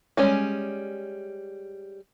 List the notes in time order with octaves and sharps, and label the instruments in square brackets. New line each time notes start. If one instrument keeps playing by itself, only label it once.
[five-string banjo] G3 G#3 C#4